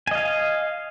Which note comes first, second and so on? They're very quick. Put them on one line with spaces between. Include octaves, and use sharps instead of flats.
G#5 D#5 F5